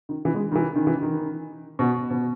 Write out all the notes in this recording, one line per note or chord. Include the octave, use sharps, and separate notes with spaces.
D#3
E3
G#3
D#3
E3
D#3
E3
D#3
B2
B2